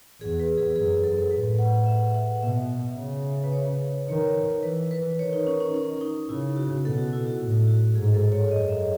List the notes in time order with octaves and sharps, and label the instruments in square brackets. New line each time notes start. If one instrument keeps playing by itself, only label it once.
[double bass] E2 [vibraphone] G#4
[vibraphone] B4
G#4
[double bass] F#2 [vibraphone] G#4
[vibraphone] A4
A4
[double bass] A2 [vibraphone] B4
[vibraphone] F#5
F#5
E5
F#5
[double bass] B2 [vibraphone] E5
[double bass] C#3
[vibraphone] B4
C#5
[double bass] D#3 [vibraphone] C#5
[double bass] E3 [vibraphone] B4
[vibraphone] B4
[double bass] D#3 [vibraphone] C#5
[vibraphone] D#4
C#4
C#4
C#4
D#4
[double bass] C#3 [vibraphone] E4
[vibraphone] F#4
[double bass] B2 [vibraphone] A4
[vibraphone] F#4
E4
F#4
[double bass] A2
[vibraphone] F#4
[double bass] G#2 [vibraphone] G#4
[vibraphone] A4
C#5
[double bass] F#2 [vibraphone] D#5
[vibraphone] E5